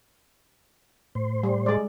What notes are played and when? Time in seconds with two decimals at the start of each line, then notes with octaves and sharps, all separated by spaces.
1.15 A2 C5
1.43 G3
1.66 G#3 D5